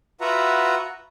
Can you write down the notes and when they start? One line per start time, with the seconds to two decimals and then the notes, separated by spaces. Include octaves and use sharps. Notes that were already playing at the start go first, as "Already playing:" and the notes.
0.21 F4 F#4 B4 E5 F#5 A#5